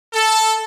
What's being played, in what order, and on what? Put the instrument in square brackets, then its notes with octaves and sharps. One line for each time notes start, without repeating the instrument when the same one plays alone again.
[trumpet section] A4